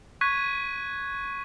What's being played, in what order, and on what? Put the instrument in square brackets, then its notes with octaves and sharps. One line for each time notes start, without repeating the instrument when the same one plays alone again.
[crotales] C#6 F#6 G#6 B6 D#7